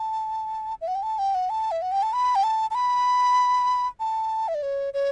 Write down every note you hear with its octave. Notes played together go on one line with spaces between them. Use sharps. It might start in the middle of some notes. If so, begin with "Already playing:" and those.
Already playing: A5
E5
F#5
G5
A5
G5
F#5
A5
E5
F#5
G5
A5
B5
G5
A5
A5
B5
A5
E5
D5
C#5
C#5